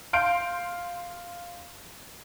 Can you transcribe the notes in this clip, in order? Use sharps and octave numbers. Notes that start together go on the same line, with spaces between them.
F5 C6 G6 D7